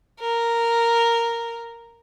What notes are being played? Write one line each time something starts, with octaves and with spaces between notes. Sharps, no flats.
A#4